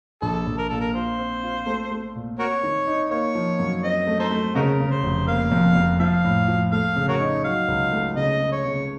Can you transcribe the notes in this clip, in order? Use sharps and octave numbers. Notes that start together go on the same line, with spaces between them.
A#1 A4
A#1
A#4
A#2 A4
A#4
F4 C5
C4
F4
A3
A3
A#2
C4 F#4 A#4 C#5
D#3
D#4
A#3 C#5
F3
F#2
C4 D#5
A3
D#4 A4 C5
A3
C#3 D#4 F#4 A#4
C#3
C5
F1
A#3 F5
F2
F2
F3 F5
A2
F3
A3 F5
C#3
F#4 A#4 C#5
D#4
F#3 F5
C#2
A3
C#3 D#5
C#3
C#5
C#3